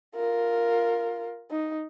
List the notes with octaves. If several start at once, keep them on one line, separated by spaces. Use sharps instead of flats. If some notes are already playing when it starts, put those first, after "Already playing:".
F4 A#4
D#4